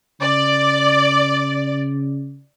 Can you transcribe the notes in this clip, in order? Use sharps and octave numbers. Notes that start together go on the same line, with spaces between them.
C#3 D5